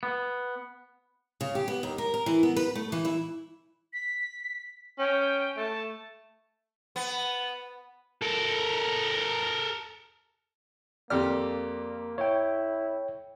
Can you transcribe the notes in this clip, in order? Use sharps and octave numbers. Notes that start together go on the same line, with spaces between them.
B3
C#3
G4
B3
D#2
A#4
A#4
E3
B3
B4
A3
E3
E4
B6
C#4 G5
A3 A5
B3
A4 A#4
F2 A#3 G4 D5 F6
E4 C#5 G5